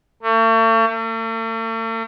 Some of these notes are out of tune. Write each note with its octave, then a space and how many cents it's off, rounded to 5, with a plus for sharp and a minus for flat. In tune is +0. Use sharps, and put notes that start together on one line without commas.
A3 +40
A3 +45